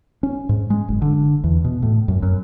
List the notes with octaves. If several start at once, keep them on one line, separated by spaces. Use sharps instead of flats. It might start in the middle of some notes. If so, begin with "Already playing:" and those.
C#4
G#2
G#3
F#1
D3
E2
B2
A2
F#2
F#2